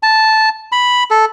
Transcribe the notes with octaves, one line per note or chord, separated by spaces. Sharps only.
A5
B5
A4